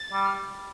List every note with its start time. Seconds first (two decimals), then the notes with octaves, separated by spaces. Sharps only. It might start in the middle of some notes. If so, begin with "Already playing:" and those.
Already playing: A6
0.13 G3
0.23 F6